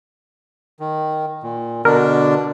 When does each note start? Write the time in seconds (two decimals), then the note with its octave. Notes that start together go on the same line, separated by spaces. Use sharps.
0.80 D#3
1.43 A#2
1.85 B2 D3 D4 A#4